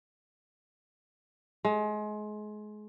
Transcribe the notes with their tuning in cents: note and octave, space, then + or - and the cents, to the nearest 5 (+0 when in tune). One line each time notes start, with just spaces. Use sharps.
G#3 +30